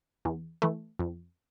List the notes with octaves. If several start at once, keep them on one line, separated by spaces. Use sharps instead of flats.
E2
E3 A3
F2